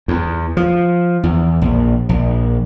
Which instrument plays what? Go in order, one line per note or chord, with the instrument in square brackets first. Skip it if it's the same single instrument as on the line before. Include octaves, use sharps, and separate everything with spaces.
[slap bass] E2
F3
E2
A#1
A#1